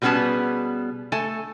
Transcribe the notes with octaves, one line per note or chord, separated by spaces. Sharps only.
B2 G3 B3 C#4 G#4 A5
A3 A4 G#5 A5